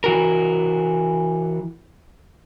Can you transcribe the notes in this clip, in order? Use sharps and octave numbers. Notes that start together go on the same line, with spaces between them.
E3 F#4 A#4